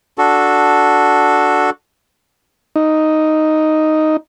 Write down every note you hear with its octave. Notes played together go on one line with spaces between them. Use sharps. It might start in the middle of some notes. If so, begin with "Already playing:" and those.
D4 F#4 A4
D#4